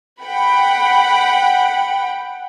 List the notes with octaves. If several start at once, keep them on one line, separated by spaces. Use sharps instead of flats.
F#5 G5 B5